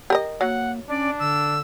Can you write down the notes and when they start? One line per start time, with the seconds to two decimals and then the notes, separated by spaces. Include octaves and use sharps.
0.10 G4 A#4 D#5
0.41 F#3 A#3 F#5
0.89 C#4 D4 D5
1.20 D3 E6